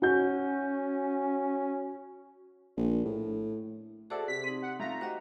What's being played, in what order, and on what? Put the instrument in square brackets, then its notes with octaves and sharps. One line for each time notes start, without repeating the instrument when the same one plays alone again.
[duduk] C#4 [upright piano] F#4 G6
[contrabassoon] A#1
A2
[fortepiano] F#4 D5 E5 [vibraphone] G#4 C5 [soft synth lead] A4
[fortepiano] C3 [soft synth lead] B6
[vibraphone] C4 D#4
[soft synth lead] F#5
[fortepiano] A3 F4 [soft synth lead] A#5
[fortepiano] F#4 G4 [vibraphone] C5 D#5